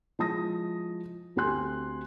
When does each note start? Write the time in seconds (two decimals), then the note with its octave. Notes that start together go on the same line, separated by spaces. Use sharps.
0.19 F3 G#3 E4 A5 D#6 A#6
1.36 D2 C4 G4 G#5 C6 F#6